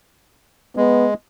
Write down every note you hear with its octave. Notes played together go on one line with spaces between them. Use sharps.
G#3 B3